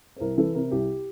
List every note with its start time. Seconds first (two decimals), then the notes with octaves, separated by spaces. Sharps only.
0.16 C5
0.20 C2 A#4
0.38 E3 A4
0.54 C3 A#4
0.71 C2 G4